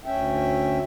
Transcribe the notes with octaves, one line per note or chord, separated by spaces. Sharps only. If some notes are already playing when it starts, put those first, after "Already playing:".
D2 C#4 E5 G5